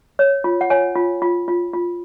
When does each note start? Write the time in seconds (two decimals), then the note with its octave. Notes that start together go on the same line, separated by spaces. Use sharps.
0.19 C#5
0.44 F4
0.61 F#5
0.70 C#5 G#5
0.96 F4
1.22 F4
1.48 F4
1.73 F4